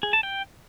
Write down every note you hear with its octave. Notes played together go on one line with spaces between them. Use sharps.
G#4
A5
G5